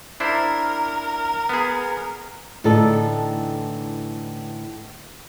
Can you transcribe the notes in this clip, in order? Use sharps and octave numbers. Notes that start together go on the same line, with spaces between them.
D4 E4 A#4 C5
B3 G#4
A2 D3 E3 D#4 A4